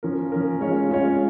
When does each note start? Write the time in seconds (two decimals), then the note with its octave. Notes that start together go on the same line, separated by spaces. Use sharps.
0.03 F3 C#4 A#4
0.32 F3 C#4 A#4
0.60 G#3 C#4 F4 C#5
0.89 G#3 C#4 F4 C#5